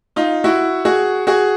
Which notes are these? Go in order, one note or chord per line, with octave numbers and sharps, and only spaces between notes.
D#4 F4
E4 F#4
F#4 G#4
F#4 G#4